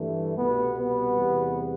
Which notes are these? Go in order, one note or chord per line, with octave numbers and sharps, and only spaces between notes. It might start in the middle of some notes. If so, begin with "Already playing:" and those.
Already playing: G2 E3 G3 A3
C2 B2 G3 B3
B3
E2 C3 G3